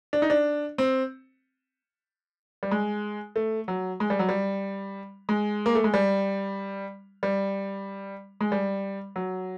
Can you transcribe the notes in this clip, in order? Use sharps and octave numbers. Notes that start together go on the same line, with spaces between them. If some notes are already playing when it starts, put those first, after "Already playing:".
D4
D#4
D4
C4
G3
G#3
A3
F#3
G#3
G3
F#3
G3
G#3
A#3
A3
G#3
G3
G3
G#3
G3
F#3